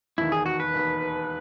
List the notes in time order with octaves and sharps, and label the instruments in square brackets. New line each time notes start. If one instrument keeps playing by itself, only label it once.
[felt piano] E1 D#2 D#3 [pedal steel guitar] E4
[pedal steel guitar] G#4
F#4
B4
[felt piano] E1 D#2 D#3